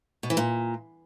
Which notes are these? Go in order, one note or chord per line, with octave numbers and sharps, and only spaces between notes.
B2
E3
A#2